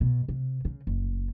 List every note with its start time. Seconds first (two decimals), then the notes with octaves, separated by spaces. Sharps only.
0.01 B2
0.28 C3
0.65 C#3
0.87 F#1